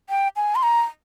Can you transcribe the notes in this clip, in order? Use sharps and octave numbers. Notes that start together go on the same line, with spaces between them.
G5
G#5
C6
A#5